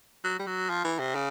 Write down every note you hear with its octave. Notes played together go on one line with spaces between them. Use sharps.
F#3
G3
F#3
F3
E3
C3
C#3